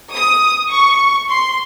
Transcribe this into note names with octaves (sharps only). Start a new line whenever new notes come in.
D#6
C#6
C6